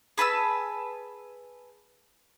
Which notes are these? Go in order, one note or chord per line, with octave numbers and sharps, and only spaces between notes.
G#4 B4 A5 E6